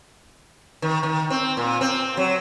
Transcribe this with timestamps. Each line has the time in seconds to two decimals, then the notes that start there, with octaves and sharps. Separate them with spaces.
0.82 D#3
1.03 D#3
1.30 C4
1.57 A#2
1.81 C4
2.17 F#3